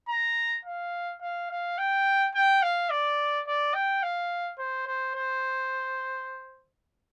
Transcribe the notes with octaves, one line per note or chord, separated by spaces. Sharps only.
A#5
F5
F5
F5
G5
G5
F5
D5
D5
G5
F5
C5
C5
C5